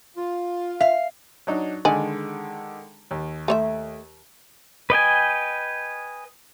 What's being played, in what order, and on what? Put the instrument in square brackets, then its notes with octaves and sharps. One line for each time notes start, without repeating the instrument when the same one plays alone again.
[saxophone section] F4
[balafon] E5 [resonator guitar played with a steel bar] F5
[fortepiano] F#3 D4 D#4
[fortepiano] D3 D#3 G#3 [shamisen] D5 D#5 G#5
[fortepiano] D#2
[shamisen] A3 C#5 E5
[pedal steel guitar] B4 D#5 G5 G#5